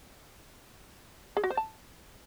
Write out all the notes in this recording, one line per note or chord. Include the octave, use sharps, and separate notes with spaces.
G#4
F#4
C5
A5